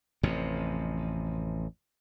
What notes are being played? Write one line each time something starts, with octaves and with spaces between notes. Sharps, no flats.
A1 F2 C3